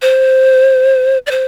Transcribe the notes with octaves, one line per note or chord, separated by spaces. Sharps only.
C5
D5
C5